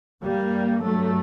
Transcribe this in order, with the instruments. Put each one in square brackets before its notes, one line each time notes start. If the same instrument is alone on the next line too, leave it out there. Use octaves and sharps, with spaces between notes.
[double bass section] G2 G3 A#3
F#3 A3